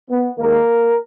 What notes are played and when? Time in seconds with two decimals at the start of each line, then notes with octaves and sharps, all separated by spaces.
0.10 B3
0.38 D#2 D#3 G#3 A#3 A#4